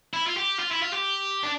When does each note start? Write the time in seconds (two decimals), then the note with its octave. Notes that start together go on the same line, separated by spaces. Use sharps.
0.14 E4
0.27 F4
0.37 G4
0.59 F4
0.71 E4
0.82 F4
0.93 G4
1.43 D4